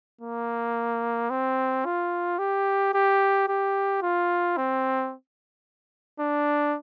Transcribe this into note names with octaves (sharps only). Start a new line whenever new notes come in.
A#3
C4
F4
G4
G4
G4
F4
C4
D4